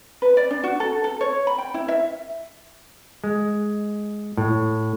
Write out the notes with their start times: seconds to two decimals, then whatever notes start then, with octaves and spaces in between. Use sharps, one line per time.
0.22 B4
0.37 D5
0.51 D4
0.64 F#4
0.80 A4
1.04 A4
1.21 C#5
1.47 B5
1.58 G5
1.74 E4
1.88 E5
3.24 G#3
4.37 A2